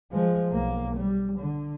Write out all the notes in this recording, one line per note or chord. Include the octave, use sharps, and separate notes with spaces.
F3 G#3
B1 A#3
G3
D3